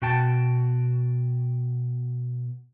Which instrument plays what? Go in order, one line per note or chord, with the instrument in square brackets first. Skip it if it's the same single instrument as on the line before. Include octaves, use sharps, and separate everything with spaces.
[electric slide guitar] B2 F#4 G5 A5